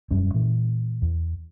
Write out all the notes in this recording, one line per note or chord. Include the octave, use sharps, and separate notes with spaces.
E1 F#2 G3 C#4
A#2 E3
E2